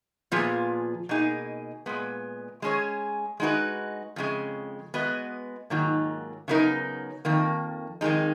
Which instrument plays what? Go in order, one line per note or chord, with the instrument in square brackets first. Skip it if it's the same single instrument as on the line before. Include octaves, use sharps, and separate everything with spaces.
[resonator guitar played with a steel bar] A#2 F3 B3 F4 G#4
B2 A#3 D#4 G#4
A#2 G#3 B3
G#3 C#4 G#4 C#5
G#3 D#4 F#4 B4
F2 C#3 G#3
G#3 B3 F#4 B4 D#5
G#2 D#3 F#3 A#3 F4
C#3 F#3 B3 D#4 A#4
F2 D#3 A#3
F2 D#3 G#3 D#4